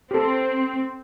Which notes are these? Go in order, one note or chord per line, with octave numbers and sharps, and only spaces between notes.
C4 G4 A4